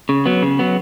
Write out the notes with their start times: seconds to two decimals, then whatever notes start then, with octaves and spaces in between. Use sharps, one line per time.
0.09 C#3
0.26 F#3 B3
0.42 C#3
0.59 F#3 B3